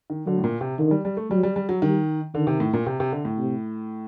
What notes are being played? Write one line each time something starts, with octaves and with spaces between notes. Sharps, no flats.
D#3
D3 F#3
A2
A#2
C3
D3 D#3
G3
G3
A3
F#3 G3
G3
G3
F#3
D#3 G3
D3 D#3
C3
A2
A#2
C3
C3
D3
A2
C3